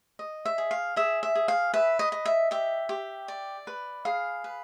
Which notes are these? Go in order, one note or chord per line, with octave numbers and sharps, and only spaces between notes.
D#5
E5
G#4
F5
G#4 E5
E5
G#4
F5
B4 E5
D#5
D#5
E5
G4 E5
G4
D5
B4
G#4 F5
B4